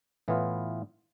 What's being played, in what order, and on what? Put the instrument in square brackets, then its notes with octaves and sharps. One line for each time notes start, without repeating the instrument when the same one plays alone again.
[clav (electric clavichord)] A2 E3 B3 F4